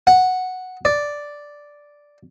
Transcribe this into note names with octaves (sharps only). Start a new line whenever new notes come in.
F#5
D5